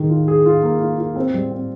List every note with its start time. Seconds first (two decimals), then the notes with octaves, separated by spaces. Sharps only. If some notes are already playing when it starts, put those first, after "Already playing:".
Already playing: D#3 G#4
0.09 F4
0.28 G#4
0.46 F4
0.63 A#3
0.81 F4
0.99 F4
1.16 C4
1.34 G3
1.51 C4